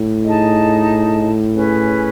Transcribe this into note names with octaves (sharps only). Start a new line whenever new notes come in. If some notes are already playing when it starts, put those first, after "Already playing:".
Already playing: A2
D#4 G#4 D#5 A5
C#4 G#4 B4